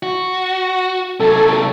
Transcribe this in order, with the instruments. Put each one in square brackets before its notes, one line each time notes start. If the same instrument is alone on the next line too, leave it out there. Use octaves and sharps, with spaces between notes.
[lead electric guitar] F#4
[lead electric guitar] C3 F#3 [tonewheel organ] A4